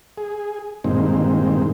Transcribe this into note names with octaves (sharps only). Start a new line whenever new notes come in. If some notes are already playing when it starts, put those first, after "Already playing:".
G#4
G2 A#2 D#3 G#3 C4